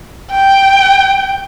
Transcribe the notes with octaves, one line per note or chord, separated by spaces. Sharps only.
G5